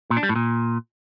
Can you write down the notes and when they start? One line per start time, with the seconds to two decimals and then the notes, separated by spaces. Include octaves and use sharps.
0.10 A#2
0.17 D4
0.23 G3
0.29 A2
0.36 A#2